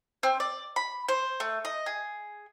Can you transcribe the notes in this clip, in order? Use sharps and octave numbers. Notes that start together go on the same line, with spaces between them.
C4
D5
B5
C5
A3
D#5
G#4